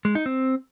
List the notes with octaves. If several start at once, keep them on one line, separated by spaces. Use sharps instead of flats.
G#3
D#4
C4